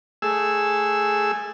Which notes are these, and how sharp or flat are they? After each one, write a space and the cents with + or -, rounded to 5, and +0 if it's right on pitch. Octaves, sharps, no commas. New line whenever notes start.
A3 +0 G#4 -5 E6 +0